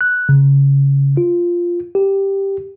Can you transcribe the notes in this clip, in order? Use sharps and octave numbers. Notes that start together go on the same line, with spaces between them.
F#6
C#3
F4
G4